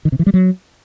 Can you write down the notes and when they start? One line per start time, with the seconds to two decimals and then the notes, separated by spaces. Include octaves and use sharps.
0.05 D#3
0.12 C3
0.19 E3
0.26 G3
0.34 F#3